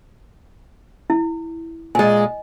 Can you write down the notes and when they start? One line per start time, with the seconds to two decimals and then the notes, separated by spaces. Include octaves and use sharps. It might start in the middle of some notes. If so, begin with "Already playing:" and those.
1.10 E4
1.95 A#2 G#3 D#5 G#5